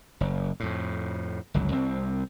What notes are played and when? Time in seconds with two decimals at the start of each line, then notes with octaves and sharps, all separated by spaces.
0.21 F#1
0.60 F2 A2
1.54 G1 C#2 F#3
1.72 C2 C4